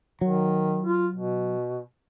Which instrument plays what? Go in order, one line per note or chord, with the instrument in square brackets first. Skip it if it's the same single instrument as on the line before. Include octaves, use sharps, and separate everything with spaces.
[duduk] D#3 [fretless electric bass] F#3
[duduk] F4
B2